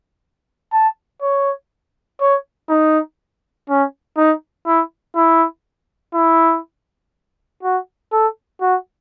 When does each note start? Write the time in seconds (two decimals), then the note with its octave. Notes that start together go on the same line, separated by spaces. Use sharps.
0.73 A5
1.22 C#5
2.21 C#5
2.69 D#4
3.69 C#4
4.17 D#4
4.67 E4
5.16 E4
6.14 E4
7.63 F#4
8.12 A4
8.61 F#4